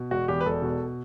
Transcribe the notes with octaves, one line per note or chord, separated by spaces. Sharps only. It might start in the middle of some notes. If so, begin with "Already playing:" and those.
Already playing: B2
E1 F#4
E2 G4
B4
E1 A4
B2